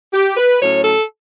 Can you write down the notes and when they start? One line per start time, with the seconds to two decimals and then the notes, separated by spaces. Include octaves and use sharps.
0.13 G4
0.36 B4
0.60 A2 F#3 A3 C#4 C#5
0.83 A4